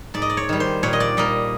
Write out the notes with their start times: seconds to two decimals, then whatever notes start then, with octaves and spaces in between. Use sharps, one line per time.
0.14 G#2 D5
0.22 D#5
0.30 D5
0.37 C#5
0.49 D#3 G3
0.60 C5
0.83 A#2 C#5
0.93 D#5
1.00 D5
1.17 G3 A#3 D#5